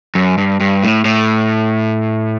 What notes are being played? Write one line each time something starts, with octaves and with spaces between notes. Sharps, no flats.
F#2
G2
G2
A2
A2